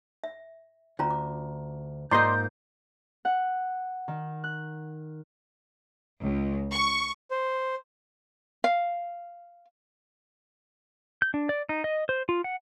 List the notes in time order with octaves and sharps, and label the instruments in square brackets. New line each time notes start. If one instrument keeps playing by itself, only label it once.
[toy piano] E5
[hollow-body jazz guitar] D2 [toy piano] C#4 F4 A#5
[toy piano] D6
[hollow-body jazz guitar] G#2 A#3 D#5 [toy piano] F4 A#5 [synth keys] D5 C6 [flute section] G6
[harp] F#5
D#3
F#6
[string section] C#2
C#6
[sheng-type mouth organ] C5
[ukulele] F5
[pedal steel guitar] G6
D4
D5
D#4
D#5
C5
F4
F#5